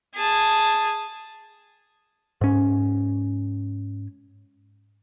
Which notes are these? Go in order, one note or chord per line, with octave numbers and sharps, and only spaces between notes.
G#4 A5
G#2 C#4